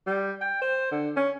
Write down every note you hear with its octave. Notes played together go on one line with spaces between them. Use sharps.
G3
G5
C5
D3
C#4